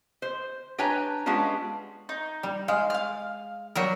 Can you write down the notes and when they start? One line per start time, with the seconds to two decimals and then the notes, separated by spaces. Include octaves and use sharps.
0.22 C5
0.78 D4 B4 C#5 G5 G#5 A#5
1.26 G3 G#3 B3 C#4 D4 F4
2.09 D#4
2.43 G3
2.68 G#3 F5
2.90 F5 F6
3.75 F#3 G3 A#4